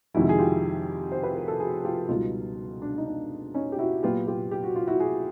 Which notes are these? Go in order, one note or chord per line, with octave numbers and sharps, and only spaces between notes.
F2 C3 D#3 G#3 E4 F#4
G#4
F4 G4
C5
B4
A#4
A4
F#4 G#4
F4 G4
C#2 B2 G3 D#4 F4
D4
D#4
D4
C#4 D#4
G4
E4 F#4
A#2 F#3 B3 F4 G4
F4 G4
G4
F#4
F4
E4 F#4
F#4 G#4